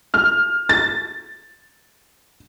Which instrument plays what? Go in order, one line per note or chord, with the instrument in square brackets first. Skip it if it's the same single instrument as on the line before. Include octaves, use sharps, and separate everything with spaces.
[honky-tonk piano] F6
A6